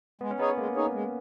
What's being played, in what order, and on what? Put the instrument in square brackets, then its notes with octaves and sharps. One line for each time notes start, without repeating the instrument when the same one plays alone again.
[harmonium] G#3 [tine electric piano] B3
[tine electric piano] C#4
[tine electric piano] B3 [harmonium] D#4 G#4 C#5
[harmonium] G#3 [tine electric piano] A#3
[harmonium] D#4 G#4 C#5
G#3